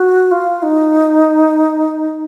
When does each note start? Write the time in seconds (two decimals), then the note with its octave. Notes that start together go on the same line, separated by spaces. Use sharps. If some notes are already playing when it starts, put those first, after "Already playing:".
Already playing: F#4
0.31 F4
0.63 D#4